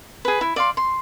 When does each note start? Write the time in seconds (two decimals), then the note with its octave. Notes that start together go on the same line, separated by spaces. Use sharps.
0.25 G#4 B4
0.41 E4
0.56 D5 F5 C6
0.77 C6